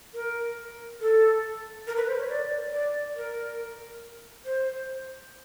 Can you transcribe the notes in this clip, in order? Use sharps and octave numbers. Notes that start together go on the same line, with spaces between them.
A#4
A4
A#4
B4
C5
C#5
D5
D5
A#4
C5